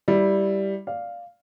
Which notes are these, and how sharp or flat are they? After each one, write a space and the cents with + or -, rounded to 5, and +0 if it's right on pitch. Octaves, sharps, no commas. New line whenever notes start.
G3 +0 E4 +0
D5 +0 F5 +0